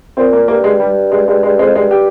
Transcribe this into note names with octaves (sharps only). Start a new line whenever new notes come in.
A#2 C4
A#3
G2 A#3
G#3
G3
G2 G#3
G2 G#3
G2 G#3
F2 G#3
G2 G#3
G4